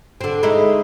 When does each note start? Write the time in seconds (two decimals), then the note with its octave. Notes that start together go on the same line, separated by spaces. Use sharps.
0.21 D3 C4
0.43 G#3 D#4 E4